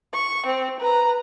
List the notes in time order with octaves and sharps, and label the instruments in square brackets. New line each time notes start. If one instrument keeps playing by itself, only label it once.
[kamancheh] C#6
C4
B4 A#5